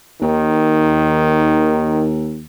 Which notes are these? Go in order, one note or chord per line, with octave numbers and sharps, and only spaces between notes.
D#2 D#3